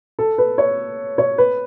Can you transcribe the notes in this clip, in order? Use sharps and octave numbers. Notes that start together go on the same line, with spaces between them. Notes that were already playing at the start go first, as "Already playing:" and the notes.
A4
B4
C#5
C#5
B4